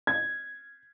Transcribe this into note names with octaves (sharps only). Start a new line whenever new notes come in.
G#6